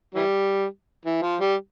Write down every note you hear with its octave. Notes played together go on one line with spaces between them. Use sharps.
E3 G3
E3
F3
G3